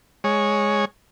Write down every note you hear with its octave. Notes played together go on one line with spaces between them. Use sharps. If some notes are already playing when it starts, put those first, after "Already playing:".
G#3 C#5